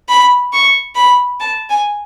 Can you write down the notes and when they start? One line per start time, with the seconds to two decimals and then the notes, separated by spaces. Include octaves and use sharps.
0.09 B5
0.53 C#6
0.96 B5
1.40 A5
1.69 G#5